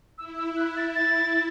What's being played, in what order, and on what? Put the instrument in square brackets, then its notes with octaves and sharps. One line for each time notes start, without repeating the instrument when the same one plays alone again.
[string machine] E4 [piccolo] E6
[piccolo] E6
[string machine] E4 [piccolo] F#6
[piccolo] A6
[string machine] E4 [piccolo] A6